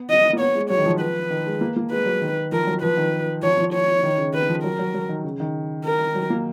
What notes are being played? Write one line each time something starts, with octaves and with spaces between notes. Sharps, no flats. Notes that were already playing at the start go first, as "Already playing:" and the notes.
Already playing: B3
D#5
A#3
B3 C#5
G#3
F#3 C#5
D#3
F3
B4
D#3
G#3
A#3
A#3
G#3 B4
F#3
D#3
F3 A#4
F#3
F3 B4
D#3
F3 C#5
F3
C#5
D#3
C#3
D#3 B4
F3
F#3 A#4
F#3
F#3
D#3
C#3
D#3
A#4
F#3
A#3